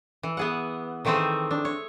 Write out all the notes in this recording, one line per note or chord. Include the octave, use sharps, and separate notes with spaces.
E3
B3 G#4 F#5
D#3 E3 A3 C4 G#4 C5
D4
C#5